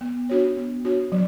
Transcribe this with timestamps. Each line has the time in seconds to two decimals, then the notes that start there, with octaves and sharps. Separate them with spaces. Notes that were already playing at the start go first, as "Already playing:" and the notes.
0.01 B3
0.29 D4 F#4 C#5
0.57 B3
0.85 D4 F#4 C#5
1.12 F#3